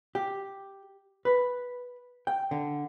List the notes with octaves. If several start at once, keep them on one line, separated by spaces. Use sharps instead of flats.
G4
B4
G5
D3